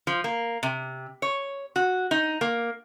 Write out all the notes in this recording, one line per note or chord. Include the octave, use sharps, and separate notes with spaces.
F3
A#3
C3
C#5
F#4
D#4
A#3